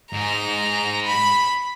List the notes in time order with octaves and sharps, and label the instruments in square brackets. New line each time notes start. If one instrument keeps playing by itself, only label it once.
[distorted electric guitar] G#2 G#4 [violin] A#5
[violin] B5